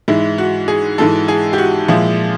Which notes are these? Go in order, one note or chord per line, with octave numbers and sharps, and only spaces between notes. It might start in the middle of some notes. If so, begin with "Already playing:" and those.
G#2 E3 G#3 E4
F#4
G#4
G#2 E3 G#3 A4
G#4
G4
F#4
A#2 F3 G#3 E4